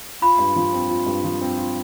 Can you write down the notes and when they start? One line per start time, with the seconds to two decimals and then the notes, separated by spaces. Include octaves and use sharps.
0.22 F4 B5
0.39 G2
0.56 F3
0.73 C4
0.89 F4
1.06 G2
1.24 F3
1.41 C4
1.58 F4